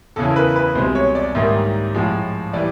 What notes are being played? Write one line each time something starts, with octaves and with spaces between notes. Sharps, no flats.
E2 C#3 E3 A4
A#4
B4
B4
C2 B2 G#3 C5
C#5
D5
G#2 D#3 G3 A#3 E5
A2 F3 G#3
E3 G3 D5